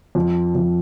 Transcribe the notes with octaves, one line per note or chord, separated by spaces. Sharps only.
F2
F2